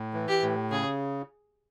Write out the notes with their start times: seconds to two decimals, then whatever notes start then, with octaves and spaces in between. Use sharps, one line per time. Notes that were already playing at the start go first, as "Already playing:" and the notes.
Already playing: A2
0.14 E3
0.28 G4
0.43 A2
0.71 C#3 G#4